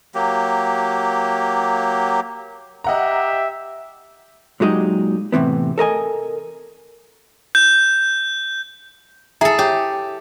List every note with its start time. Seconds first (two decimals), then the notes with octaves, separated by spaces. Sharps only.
0.15 F#3 A#3 G4
2.84 G4 D#5 E5 F#5 A#5
4.60 A#2 F#3 G#3 D#4 G4
5.32 A2 C3 E3 B3
5.78 A4 A#4 D#5 G#5
7.55 G6
9.41 E4 G#4 A4 E5 A#5
9.59 G4 C#5